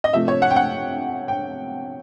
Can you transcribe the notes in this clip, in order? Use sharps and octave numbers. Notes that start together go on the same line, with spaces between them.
D#5
C3 F3 A3 E5
C#5
F#5
G5
F#5
G5